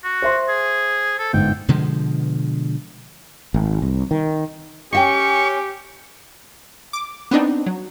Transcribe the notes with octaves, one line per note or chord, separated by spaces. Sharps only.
F#4
C5 E5 C6
G#4
A4
G1 G#2 G5
B2 D3 F3 G#3
G#1
C2
D#3
C#4 G4 D#5 E5 G5 C#6
D6
B3 C4 D4 D#4
F#3